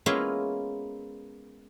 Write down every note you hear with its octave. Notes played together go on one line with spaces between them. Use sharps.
G#3 A#3 B3 C#4 E4 F4